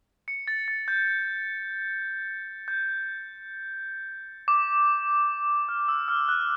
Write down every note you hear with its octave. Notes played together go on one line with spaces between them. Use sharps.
C#7
A6
A6
G6
G6
D6
F6
E6
F6
F#6